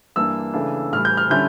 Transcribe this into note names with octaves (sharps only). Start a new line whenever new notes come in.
G2 E3 A#3 D4 E6
C#3 E3 A3 D4
A2 E3 G3 F6
G6
F6
D3 G3 C#4 E4 G6